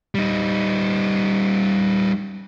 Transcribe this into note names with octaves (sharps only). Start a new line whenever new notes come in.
G3 D#4